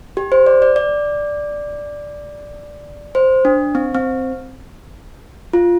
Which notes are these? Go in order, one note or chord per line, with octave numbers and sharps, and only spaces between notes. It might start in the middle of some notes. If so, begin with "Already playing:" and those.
G4
C5
D5
D5
D5
C5
D4
C4
C4
F4